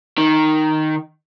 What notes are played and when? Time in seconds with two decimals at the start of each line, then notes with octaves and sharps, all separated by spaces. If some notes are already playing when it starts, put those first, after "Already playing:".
0.18 D#3